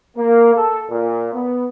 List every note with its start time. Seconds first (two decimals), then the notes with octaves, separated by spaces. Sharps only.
0.17 A#3
0.55 A4
0.90 A#2
1.34 B3